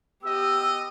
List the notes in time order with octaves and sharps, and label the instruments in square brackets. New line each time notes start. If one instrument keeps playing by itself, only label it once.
[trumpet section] B3 D#5 [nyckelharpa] G4 [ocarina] E6